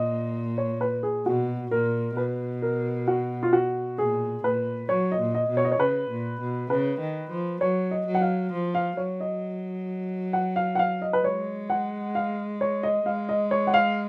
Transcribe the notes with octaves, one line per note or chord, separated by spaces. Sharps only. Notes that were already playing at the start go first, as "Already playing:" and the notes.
Already playing: A#2 D#5
C#5
B4
G#4
B2 F#4
A#2 A#4
B2 B4
A#4
F#4
F4
F#4
A#2 G#4
A#2 B4
F#3 C#5
D#5
A#2
D#5
B2
C#5
D#5
C#5
C#3 B4
A#2
B2
C#3 B4
D#3
F3
F#3 C#5
D#5
F#3
F#5
F5
F3
F5
F#3 C#5
D#5
F#5
F5
F#5
F5
D#5
B4
G#3 C#5
F#5
F5
C#5
D#5
G#3 F5
D#5
C#5
F#5
F5